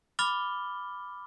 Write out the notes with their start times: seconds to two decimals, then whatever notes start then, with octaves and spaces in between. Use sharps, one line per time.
0.19 B5 D6 F6 A6 G7